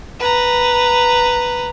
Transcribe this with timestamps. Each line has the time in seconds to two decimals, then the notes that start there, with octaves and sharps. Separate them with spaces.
0.20 B4 A#5